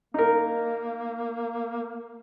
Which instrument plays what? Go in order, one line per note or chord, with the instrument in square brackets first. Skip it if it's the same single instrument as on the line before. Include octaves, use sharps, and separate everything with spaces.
[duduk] A#3 [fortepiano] D#4 A#4